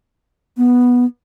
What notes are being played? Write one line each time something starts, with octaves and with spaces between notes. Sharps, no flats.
B3